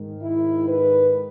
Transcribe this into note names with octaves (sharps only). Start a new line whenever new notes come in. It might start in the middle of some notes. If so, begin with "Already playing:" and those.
Already playing: G#2 D#3
E4
B4